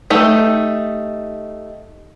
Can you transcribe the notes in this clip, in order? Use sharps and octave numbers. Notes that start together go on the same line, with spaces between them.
A3 D#4 G4